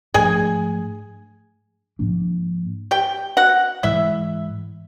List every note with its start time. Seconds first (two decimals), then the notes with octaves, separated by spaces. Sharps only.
0.14 G#2 F3 A3 D4 G#4 G#5
1.99 G#2 F3 A#3 D4
2.91 G4 G5
3.37 F#4 F#5
3.83 G#2 E3 G#3 E4 E5